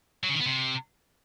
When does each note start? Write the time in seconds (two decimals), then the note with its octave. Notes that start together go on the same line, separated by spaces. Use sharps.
0.24 F#3
0.29 C#3
0.35 D#3
0.40 B3
0.46 C3